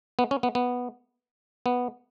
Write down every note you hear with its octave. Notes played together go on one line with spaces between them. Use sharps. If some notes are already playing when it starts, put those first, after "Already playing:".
B3
C#4
B3
B3
B3